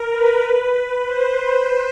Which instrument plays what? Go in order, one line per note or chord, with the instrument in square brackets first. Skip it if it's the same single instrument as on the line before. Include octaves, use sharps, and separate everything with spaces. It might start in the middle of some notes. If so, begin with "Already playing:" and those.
Already playing: [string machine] A#4
B4
C5